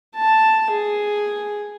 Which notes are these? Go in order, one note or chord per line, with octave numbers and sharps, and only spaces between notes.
A5
G#4